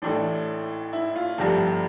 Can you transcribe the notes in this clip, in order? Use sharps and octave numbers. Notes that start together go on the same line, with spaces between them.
A1 A2 E3 A3 D4
E4
F4
G1 G2 F3 A3 G4